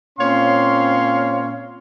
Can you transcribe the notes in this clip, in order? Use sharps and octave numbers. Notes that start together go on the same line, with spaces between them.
A#2 C4 C#4 C#5 F5 C6